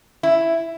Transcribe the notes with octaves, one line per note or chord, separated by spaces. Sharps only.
E4